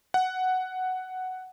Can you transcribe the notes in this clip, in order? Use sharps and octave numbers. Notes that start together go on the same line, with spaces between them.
F#5